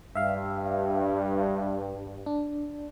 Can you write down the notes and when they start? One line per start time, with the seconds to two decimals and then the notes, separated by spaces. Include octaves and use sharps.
0.15 G2 E5 F5
2.26 D4